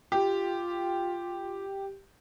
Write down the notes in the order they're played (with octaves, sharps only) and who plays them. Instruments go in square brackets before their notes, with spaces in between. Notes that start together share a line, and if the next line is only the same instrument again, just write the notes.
[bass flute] F4 [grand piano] G4